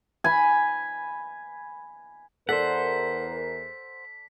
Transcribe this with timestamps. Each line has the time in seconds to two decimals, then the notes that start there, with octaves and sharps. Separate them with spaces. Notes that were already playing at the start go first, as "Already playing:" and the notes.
0.24 G#5 B5
2.49 E2 A4 A#4 C5 D5 F#5 B6